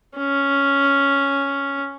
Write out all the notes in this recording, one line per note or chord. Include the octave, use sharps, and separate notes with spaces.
C#4